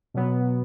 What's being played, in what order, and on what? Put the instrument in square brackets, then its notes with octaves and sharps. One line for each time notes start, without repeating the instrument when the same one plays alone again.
[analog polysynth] B2 F#3 B3